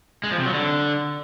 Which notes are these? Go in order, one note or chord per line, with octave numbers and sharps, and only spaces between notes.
G#3
F3
C3
F#3
D3